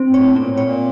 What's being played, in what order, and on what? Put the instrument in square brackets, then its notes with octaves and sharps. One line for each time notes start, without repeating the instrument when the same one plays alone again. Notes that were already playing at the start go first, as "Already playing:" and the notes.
Already playing: [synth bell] C4
[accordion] G#2
[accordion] A2 [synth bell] C#5
[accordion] A#2 [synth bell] C4
[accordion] A2
[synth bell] C#5
[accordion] A#2